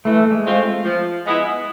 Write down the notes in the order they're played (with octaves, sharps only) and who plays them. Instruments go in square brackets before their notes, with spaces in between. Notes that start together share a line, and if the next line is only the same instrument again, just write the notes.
[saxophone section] E3 [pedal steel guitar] A3
[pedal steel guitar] G#3
[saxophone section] A3 C4 F4
F3
G#3 B3 E4